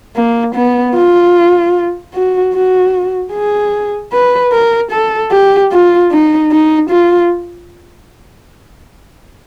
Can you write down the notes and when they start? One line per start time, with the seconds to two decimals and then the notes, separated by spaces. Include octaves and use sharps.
0.16 A#3
0.55 B3
0.95 F4
2.14 F#4
2.54 F#4
3.33 G#4
4.13 B4
4.53 A#4
4.92 A4
5.31 G4
5.72 F4
6.12 D#4
6.51 D#4
6.90 F4